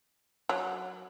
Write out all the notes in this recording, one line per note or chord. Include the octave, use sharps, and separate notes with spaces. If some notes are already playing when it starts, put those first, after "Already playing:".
F#3